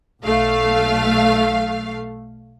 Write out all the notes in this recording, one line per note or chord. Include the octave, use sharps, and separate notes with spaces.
B1 A3 F5